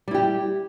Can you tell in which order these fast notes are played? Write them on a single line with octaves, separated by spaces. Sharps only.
G3 E4 G4